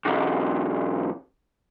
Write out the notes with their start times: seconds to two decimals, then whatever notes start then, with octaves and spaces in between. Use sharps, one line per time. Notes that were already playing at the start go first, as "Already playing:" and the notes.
0.05 B1 E2